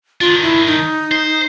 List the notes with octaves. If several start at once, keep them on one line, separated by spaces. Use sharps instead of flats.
D#3 D4 F4
E4
D#4
C5